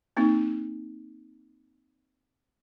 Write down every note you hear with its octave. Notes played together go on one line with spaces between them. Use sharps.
A#3 C4 D#4